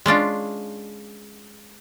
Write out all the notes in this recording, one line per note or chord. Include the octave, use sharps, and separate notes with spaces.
G#3 C#4 D4 F4